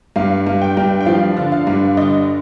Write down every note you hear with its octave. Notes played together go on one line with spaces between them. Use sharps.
G2 F5
G2
G5
G2
G5
F3 F5
D3
F5
G2
D3 D#5